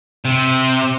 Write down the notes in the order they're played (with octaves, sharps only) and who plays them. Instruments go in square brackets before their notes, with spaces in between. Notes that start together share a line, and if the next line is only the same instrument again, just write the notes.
[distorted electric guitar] C3